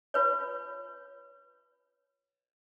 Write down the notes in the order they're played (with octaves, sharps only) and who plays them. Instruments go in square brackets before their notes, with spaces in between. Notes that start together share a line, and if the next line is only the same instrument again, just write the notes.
[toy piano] F4 B4 C#5